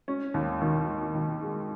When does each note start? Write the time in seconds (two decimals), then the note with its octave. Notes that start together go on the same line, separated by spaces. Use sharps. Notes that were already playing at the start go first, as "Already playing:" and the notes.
0.08 C#4
0.34 D#2
0.62 D#3
0.88 D#3
1.15 D#3
1.42 G#3